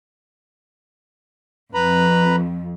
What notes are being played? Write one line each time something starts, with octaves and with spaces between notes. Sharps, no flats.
F2 B4 A#5 B5